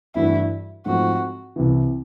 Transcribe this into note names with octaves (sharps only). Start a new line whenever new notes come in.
G2 E3 A3 D4 E4 F#4
G#2 F3 A3 C4 F#4
C2 C3 E3